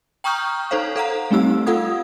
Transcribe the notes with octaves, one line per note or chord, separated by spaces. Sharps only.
G5 A#5 C#6 D#6 F6 G6
D#4 A4 C5 C#5 F5
A4 F5 F#5 A#5
G3 A3 C4 D#4 G4 E6
F4 A4 F5 F#5 D#6 G#6